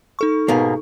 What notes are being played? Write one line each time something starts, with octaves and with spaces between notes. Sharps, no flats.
D#4 A4 C#6
G#2 B2 A#3